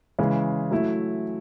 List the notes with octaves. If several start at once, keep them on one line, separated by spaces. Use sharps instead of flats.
C#3 E3 G#3
F#3 A3 E4